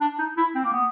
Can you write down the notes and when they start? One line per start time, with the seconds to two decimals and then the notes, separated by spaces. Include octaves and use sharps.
0.01 D4
0.19 D#4
0.37 E4
0.55 C4
0.65 A#3
0.72 B3